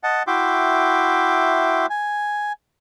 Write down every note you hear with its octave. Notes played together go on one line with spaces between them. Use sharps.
D#5 F#5 A5
E4 F#4 E5 G5 C6 D6
G#5